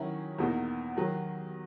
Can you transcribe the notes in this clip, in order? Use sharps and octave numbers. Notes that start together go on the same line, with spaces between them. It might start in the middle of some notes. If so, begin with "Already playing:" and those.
Already playing: D#3 F#3 C#4 E4
E2 B2 A#3 D#4
D#3 F#3